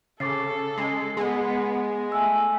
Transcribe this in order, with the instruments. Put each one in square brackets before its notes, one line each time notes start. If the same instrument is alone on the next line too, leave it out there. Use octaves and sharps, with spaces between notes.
[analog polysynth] C#3 [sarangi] A4 [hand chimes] D6 A6 C7
[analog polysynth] G#3 [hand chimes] C7
[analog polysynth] G#3 [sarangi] B3 [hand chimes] G#4
[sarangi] A3 [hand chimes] G#5 E6